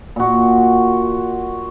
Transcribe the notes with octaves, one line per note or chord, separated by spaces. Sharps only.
A#2 F#4